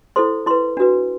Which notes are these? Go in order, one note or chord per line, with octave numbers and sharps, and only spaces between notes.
E4 A4 C5 C6
E4 B4 C6
D4 F#4 B4